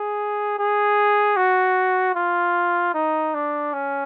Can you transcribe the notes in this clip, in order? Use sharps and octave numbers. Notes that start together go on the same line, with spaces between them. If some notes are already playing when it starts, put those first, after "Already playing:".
Already playing: G#4
G#4
F#4
F4
D#4
D4
C#4